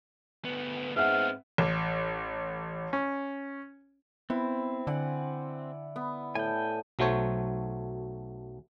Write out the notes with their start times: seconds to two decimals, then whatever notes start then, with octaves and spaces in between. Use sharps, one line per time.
0.45 D2 B3
0.96 G#2 B3 C4 E5 F#5 F6
1.58 A1
2.93 C#4
4.30 B3 C4 E4
4.87 D3 D5 F#5 G#5
5.96 B3
6.35 A2 G5 G#5
6.99 B1 F#3 A3 C5 C#5